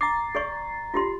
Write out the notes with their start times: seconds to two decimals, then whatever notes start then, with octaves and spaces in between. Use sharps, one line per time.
0.01 A#5 D6 A6 C7
0.35 G#4 D5 C#6
0.94 F4 G4 C6